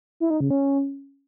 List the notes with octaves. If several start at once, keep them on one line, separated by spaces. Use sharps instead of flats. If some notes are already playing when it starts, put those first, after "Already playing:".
E4
D#4
C#3
C#4